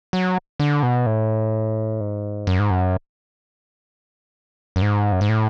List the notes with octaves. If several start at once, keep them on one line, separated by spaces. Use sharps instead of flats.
F#3
D3
B2
A2
G#2
F#2
G#2
F#2
F#2
G#2
F#2
G#2
A2